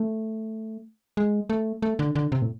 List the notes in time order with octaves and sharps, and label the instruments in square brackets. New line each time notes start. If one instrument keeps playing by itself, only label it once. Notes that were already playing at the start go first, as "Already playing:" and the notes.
Already playing: [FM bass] A3
G#3
A3
A3
D3
D3
C3
A2